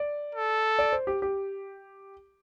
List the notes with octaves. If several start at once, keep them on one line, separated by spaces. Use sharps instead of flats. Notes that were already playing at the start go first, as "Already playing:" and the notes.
Already playing: D5
A4
D5
C5
G4
G4